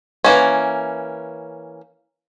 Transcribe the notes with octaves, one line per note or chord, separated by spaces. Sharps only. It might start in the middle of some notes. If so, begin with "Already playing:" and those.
E3 A#3 C#4